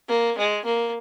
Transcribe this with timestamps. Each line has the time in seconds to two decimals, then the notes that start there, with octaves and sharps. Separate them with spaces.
0.09 A#3
0.38 G#3
0.65 A#3